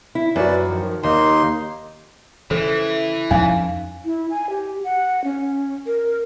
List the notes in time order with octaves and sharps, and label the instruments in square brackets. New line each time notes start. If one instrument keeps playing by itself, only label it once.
[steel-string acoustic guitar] E4
[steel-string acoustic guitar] F#2 F#4 [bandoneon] B4 D5
[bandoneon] D#3 F3
[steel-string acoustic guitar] D#2 [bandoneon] A#3 D#4 C6
[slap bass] C#3 [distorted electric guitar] E3 [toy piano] A4 C5
[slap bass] F2 F3 C#4 [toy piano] D#4 F5 G#5
[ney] E4
G#5
G4
F#5
C#4
A#4